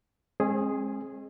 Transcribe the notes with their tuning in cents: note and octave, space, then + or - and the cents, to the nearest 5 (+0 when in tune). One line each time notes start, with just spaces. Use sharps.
G#3 +0 C4 +45 G#4 +0